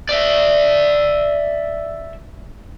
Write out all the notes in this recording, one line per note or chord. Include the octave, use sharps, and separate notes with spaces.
D5 E5